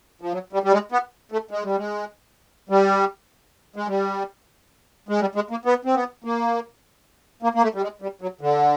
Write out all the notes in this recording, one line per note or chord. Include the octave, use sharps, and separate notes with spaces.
F3
F#3
G3
G3
G#3
B3
A3
G#3
G3
G#3
G3
G#3
G3
G#3
G3
G#3
A#3
B3
C4
B3
A#3
A#3
A#3
A3
G3
G#3
G3
F#3
D3